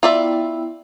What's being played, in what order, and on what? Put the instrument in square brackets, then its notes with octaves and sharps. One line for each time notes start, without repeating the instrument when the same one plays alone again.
[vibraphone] B3 E4 G5 [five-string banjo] F4 D5 E5